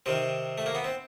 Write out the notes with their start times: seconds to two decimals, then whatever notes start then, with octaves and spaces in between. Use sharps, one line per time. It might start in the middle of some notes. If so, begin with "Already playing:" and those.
0.06 C3 D#3 C4
0.58 A3
0.66 A#3
0.75 B3
0.84 C4